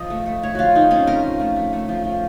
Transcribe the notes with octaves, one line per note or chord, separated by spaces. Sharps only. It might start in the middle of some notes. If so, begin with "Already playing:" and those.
Already playing: F3 D#5
A3
A3
A3 C#5
F3 F4 F#4
F3 D#4
C4 C#4
A3 A#4
F3
A3
A3
A3
F3
F3